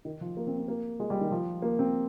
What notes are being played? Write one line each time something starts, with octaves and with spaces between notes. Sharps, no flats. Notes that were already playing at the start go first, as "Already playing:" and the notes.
D#3
F3
A#3
C4
C4
A#3
G#3
G3
D#3
F3
A#3
C4